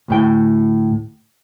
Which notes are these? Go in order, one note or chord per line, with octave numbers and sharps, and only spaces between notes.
D2 A2 G5